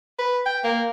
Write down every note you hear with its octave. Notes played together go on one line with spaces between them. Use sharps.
B4
G5
A#3